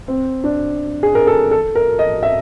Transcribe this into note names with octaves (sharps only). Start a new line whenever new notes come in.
C4
D4
G#4
A#4
A4
A4
A#4
D#5
E5